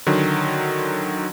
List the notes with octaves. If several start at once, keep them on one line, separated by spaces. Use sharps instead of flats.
D3 D#3 F#3